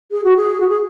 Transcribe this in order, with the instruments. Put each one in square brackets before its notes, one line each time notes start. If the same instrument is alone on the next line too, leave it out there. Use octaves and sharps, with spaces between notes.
[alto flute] G#4
F#4
G#4
F#4
G#4